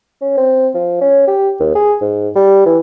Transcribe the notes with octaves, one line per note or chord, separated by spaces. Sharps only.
C#4
C4
F3
C#4
G4
D#2
G#4
G#2
G3
E3